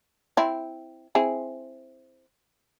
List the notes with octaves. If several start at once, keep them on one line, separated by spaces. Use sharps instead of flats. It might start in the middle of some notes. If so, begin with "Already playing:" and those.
C4 E4
C4 E4 G#4